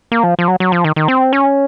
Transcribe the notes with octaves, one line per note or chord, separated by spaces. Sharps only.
A#3
F3
F3
F#3
F#3
F3
D#3
D#3
C4
C#4